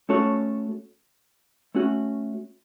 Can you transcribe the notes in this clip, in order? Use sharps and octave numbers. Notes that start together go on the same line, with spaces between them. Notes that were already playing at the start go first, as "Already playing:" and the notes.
A3 C#4 F#4 A4 C#5
A3 C#4 F#4